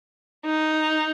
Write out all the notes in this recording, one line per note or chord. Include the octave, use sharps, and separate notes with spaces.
D#4